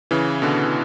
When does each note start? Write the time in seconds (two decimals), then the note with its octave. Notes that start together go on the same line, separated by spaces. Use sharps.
0.11 C#3 E3
0.42 B2 D3